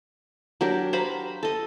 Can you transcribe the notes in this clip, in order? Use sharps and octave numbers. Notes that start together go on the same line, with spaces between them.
F#3 D4 G4 A#4
C5 F5 A#5 B5
A4 D#5